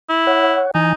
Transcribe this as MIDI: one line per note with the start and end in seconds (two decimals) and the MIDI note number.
0.09 0.61 64
0.27 0.71 73
0.27 0.71 78
0.75 0.93 52
0.75 0.93 63
0.75 0.93 80